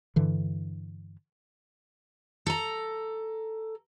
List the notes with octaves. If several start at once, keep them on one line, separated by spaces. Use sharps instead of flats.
G2 D3 E3
A4 A#5